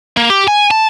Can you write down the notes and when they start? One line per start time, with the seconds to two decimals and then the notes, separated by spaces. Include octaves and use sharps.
0.17 A#3
0.30 G4
0.48 G#5
0.71 A5